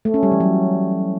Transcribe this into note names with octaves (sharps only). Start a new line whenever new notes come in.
A3
C#4
G3
E3
F#3